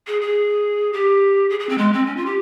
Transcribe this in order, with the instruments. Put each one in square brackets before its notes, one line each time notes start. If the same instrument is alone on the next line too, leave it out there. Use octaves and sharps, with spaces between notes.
[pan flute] G#4
G#4
G4
G#4
G#4
C4
G#3
C4
C#4
F4
G4